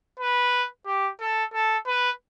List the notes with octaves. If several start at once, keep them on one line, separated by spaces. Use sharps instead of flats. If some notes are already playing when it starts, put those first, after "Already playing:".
B4
G4
A4
A4
B4